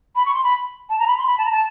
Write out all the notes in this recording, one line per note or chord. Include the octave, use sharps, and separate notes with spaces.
B5
C#6
C6
B5
A5
A#5
B5
C6
B5
A5
A#5
A5